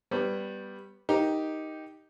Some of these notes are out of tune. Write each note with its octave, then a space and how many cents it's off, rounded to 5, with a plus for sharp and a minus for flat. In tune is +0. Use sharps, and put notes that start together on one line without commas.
G3 +0 B3 +0 C#5 -35
D#4 +5 G4 +0 A#4 +0